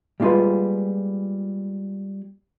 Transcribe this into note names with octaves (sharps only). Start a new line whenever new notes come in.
G3 G#3 A#3 F4 G#4 B4